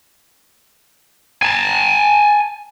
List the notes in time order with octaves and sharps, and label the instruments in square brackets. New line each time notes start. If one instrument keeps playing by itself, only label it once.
[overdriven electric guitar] G#5 A5